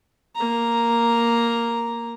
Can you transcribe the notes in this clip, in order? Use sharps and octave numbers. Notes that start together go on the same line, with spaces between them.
A#3 A#5